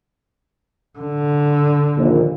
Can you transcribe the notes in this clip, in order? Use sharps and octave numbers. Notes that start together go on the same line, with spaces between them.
D3
A#1 D#2